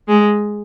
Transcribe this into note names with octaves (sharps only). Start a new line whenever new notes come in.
G#3